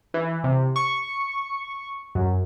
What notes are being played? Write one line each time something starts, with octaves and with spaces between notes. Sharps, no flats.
E3
C3
C#6
F#2